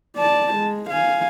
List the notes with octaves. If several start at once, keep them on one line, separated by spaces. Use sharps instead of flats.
D5 A5
G#3
F5 G#5